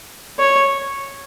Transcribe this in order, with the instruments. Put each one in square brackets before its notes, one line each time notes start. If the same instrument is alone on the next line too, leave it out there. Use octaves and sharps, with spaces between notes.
[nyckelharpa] C#5